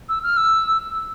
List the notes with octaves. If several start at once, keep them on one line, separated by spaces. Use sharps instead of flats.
E6
F6
E6